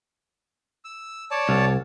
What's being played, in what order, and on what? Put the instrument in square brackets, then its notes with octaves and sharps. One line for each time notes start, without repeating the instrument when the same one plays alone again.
[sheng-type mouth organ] E6
C#5 D5 A5
[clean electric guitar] C2